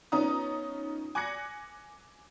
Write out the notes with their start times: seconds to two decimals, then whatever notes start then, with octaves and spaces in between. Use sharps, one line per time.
0.12 F3 B3 C#4 D#4 A#5 D#6
1.15 G#5 D6 F#6 G#6 A#6 C#7